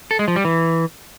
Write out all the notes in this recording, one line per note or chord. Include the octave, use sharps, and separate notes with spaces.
A4
G#3
F3
G3
E3